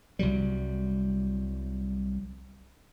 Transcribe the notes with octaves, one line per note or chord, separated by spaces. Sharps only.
C2 F#3 G3